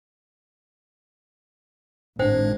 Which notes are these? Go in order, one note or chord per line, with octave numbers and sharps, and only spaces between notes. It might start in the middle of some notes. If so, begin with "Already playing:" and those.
G#1 A2 D4 C5 F#5 G5